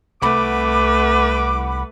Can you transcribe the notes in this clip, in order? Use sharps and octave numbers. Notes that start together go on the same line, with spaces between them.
C2 A3 B4 F#5 B5 D6